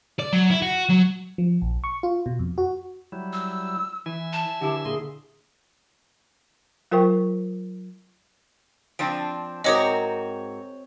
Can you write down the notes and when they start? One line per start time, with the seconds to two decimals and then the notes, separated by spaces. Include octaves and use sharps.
0.19 D5
0.33 F#3
0.50 E4
0.62 F#4
0.90 F#3
1.38 F3
1.62 A#1
1.84 C#6
2.03 F4
2.26 B2
2.39 F2
2.58 F#4
3.12 F#3 G3 E4
3.33 E6
4.06 E3 E5 G#5
4.33 A5
4.61 D3 E4 G4
4.85 A#2 A#3 G#4 C6
6.91 F#3 F4 A#4 C5 G5 C#6
8.99 F3 C4 D4 D7
9.64 G#2 C4 F#4 A#4 C#5 D#5 D6 D#6